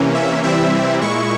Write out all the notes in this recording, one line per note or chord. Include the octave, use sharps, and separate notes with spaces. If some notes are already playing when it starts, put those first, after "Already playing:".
Already playing: C3 E3 A#3 C#4
E5
C3 E3 G3 C4 E4 E5
A#2 G#3 E4 C#6